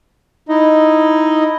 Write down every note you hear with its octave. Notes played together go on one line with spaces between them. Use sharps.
D#4 E4 D#5